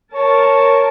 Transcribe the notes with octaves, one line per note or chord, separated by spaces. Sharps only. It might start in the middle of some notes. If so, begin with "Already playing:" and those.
A#4 C#5 A5